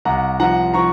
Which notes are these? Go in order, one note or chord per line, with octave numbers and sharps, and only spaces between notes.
C2 F#5 A#5
F3 F#5 A#5
F3 A#5 C#6